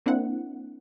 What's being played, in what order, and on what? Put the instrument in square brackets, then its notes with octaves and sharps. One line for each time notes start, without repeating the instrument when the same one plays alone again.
[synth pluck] A#3 C4 D4 E4 F#5